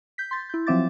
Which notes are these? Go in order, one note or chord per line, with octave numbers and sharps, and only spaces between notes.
G6 B6
C6 A6
E4 G6
F3 F#3 C4 E5 D6 A6